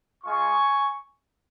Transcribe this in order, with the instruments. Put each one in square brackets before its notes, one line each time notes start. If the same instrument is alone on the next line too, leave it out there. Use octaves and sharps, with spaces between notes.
[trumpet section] G#3 F4 G#5 C#6